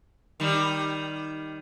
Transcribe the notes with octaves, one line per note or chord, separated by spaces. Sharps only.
D#3 G3